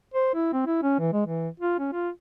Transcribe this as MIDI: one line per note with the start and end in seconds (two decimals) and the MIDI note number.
0.14 0.34 72
0.35 0.50 64
0.53 0.64 60
0.66 0.82 64
0.83 0.99 61
0.99 1.12 52
1.13 1.25 56
1.26 1.49 52
1.60 1.77 65
1.79 1.89 61
1.92 2.09 65